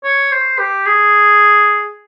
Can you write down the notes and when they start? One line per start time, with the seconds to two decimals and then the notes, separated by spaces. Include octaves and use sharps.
0.04 C#5
0.32 C5
0.58 G4
0.86 G#4